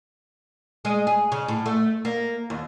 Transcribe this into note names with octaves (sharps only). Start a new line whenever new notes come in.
G#3
G#4
C#3
A2
A3
A#3
D#2